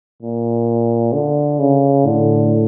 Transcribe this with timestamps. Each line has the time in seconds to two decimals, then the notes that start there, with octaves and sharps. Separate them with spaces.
0.23 A#2
1.13 D3
1.60 C#3
2.05 A2 D3